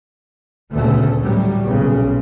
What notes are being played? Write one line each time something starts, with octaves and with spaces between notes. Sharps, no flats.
D2 A#2 C#3 A3 B3
A2 F#3 G3
B1 A#2 C#3